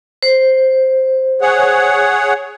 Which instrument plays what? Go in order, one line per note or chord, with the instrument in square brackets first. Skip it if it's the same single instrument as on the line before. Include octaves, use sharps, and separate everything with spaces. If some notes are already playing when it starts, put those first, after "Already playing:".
[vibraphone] C5
[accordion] G#4 C#5 F#5